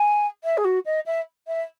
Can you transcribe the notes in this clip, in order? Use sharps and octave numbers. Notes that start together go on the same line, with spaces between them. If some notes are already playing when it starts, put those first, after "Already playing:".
Already playing: G#5
E5
G#4
F#4
D#5
E5
E5